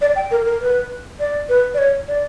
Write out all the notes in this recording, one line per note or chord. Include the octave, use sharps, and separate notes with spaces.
D5
G5
A#4
A#4
B4
D5
B4
D5
C#5
D5